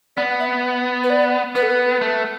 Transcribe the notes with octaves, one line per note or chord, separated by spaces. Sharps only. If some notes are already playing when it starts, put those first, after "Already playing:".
B3 D5
F#5
E5
B4
D5
B3 B4
A4
B4
A3